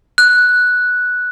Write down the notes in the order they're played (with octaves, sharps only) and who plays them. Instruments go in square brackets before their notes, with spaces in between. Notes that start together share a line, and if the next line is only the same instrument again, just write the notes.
[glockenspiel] F#6